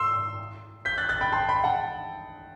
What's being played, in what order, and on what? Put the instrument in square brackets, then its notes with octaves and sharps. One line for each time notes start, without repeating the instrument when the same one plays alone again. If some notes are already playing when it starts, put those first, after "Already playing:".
Already playing: [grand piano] C6 E6
G6 B6
F#6 A6
F#6 A6
G5 B5
A5 C6
G5 B5
F#5 A5